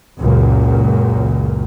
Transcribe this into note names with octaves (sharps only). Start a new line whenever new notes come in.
C#2 F#2 A#2